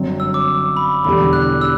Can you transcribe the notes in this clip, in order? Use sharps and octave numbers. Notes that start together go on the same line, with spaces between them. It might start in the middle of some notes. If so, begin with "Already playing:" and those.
Already playing: G1 F#2 F#3 C4
E6
D6
B5
E1 E2 D3 G3 B5
F#6
E6